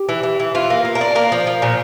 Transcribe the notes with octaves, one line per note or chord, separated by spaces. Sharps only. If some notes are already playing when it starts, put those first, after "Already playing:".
Already playing: G4
E3
E3
E3
E3 F4
A#3
A#3
A#4
D4
A#3 A#4
F3
F3
A#2